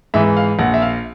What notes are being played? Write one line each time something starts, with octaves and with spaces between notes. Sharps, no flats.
G#2 E3 E5
F5
A#1 F#5
E5
F5